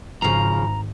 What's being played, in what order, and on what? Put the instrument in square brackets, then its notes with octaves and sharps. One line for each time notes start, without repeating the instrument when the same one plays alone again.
[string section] G#1 [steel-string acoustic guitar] C#3 F3 [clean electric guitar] A#5